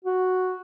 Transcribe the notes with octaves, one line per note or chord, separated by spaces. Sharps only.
F#4